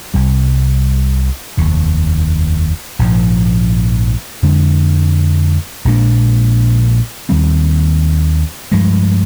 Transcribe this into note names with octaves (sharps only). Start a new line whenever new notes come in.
C2 C3 G3
F1 D#2 D#3
A#1 G#2 F3
F2 D3 G#3 D4
A#1 A#2 G#3 D4
D#2 D#3 G3 C4
G2 F3 G#3